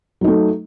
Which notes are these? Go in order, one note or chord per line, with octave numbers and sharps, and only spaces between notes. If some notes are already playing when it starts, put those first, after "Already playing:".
F#3 A3 D#4